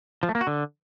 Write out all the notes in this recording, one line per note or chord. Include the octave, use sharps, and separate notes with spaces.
F3
A3
A#3
F#4
D3